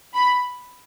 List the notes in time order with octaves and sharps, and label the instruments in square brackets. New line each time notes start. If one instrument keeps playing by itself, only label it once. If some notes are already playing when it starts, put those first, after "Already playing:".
[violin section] B5